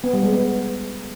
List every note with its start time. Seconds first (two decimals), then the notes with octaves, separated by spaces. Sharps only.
0.04 B3
0.14 G3
0.23 G#3
0.33 B3